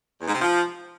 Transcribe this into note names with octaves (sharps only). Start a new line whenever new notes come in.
E2
G#2
C3
F3